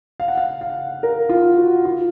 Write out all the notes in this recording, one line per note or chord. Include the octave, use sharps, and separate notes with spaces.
F5
F#5
F5
F5
A#4
F4
F#4
F4